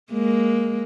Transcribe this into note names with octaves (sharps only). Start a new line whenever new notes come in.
G#3 A#3